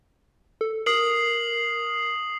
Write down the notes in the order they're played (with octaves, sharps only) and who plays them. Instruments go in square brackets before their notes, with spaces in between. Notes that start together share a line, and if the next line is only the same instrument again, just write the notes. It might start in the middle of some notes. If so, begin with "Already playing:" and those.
[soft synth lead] A4
[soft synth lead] A#4 [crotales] D#6 C7 F#7